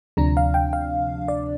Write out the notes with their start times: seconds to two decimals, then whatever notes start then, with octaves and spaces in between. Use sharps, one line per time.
0.17 D2 C3 F3 D4 A#5
0.37 F5
0.54 G5
0.73 F5
1.28 D5